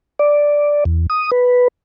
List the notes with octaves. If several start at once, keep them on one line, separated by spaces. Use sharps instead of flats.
D5
E2
D#6
B4